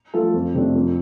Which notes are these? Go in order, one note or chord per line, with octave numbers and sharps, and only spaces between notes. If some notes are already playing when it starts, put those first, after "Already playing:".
F3 A3 F4 A4
F2
C3 A3 D4
F2